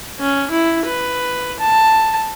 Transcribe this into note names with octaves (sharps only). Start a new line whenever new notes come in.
C#4
E4
B4
A5